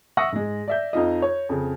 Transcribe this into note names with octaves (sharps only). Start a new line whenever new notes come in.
E5 F#5 C#6 D#6 E6 A#6
G#2 G#3
D5 E5 G6
F2 D#4 F4 D#5
C#5
F2 C#3